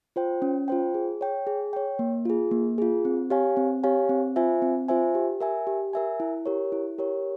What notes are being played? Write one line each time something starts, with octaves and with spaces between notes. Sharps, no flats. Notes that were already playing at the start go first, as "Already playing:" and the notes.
F4 C5 G5
C#4
F4 C5 G5
G#4
C#5 G5
G#4
C#5 G5
A#3
F4 G#4
A#3
F4 G#4
C4
G4 C#5 F5 G#5
C4
G4 C#5 F5 G#5
C4
F4 C5 E5 G#5
C4
F4 C5 E5 G#5
G4
A#4 E5 G#5
G4
A#4 E5 G#5
E4
G4 A#4 C#5
E4
G4 A#4 C#5